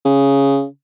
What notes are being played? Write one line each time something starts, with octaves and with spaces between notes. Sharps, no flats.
C#3